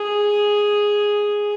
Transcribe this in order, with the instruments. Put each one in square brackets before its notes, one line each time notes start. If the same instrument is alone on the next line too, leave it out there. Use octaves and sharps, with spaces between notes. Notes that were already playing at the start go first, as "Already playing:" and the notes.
Already playing: [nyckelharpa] G#4